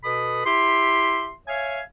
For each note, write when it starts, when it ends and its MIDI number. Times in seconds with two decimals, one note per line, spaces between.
0.03 0.42 47
0.03 0.42 69
0.03 0.42 71
0.03 0.42 83
0.03 0.42 87
0.45 1.32 64
0.45 1.32 67
0.45 1.32 76
0.45 1.32 84
1.48 1.80 73
1.48 1.80 76
1.48 1.80 77
1.48 1.80 80